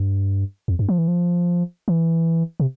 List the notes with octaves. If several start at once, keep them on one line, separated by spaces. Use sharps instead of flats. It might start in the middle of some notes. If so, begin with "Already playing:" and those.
Already playing: G2
F2
G2
F3
E3
F3
E3
C3